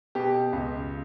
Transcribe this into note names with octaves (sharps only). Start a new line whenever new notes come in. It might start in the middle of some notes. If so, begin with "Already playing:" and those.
B2 G4
C#2